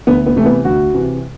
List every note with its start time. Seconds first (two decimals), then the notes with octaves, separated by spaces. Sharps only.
0.07 D2 B3
0.26 B3
0.36 C3 E3 A3
0.46 B3
0.65 D2 F#4
0.94 C3 E3